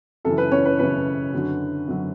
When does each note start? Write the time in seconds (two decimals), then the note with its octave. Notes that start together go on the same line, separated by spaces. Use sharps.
0.25 F#2 C#3 E3 A4
0.38 B4
0.52 C#4 C#5
0.65 B4
0.79 F#2 C#3 E3 B4
1.33 F#2 D3 F#3
1.88 F#2 D3 F#3